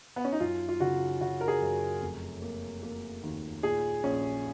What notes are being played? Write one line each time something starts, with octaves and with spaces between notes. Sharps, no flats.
B3
C#4
D#4
F#2 F4
F4
C#3 F#4
C#3 F#4
A#4
G#4
F#2
F1
A#3
A#3
D#2
A#2 G#4
A#1 C#4